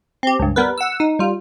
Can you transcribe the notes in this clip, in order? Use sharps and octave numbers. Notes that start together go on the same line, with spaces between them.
C4 G4
C#2 G2
G3 B3 A#4 B4
F#5 E6
D#4
G3 F4